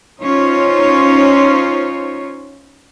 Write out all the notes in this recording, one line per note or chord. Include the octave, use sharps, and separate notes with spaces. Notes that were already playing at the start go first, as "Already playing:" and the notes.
C#4 D#4 F4 C5 C#5